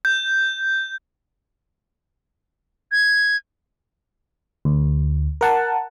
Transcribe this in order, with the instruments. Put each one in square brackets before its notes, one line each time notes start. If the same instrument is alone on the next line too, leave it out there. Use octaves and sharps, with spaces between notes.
[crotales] G6
[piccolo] G#6
[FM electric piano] D2
A#4 F#5 A5